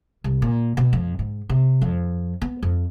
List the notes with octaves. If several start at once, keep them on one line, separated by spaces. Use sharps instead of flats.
C2
A#2
B2
F2
G#2
C3
F2
B3
F2